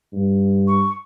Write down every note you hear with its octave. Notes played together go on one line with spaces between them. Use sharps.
G2
C#6